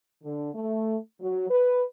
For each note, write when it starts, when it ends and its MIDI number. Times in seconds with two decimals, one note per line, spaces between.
0.24 0.48 50
0.53 0.96 57
1.20 1.47 54
1.50 1.83 71